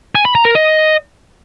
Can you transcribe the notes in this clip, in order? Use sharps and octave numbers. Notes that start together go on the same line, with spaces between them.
G#5
B5
A#5
A#4
D#5